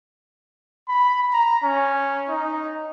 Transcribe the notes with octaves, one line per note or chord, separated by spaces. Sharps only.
B5
A#5
C#4
D#4